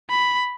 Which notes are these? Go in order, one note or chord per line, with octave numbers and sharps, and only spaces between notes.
B5